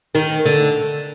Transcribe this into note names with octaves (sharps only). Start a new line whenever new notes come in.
D#3
D3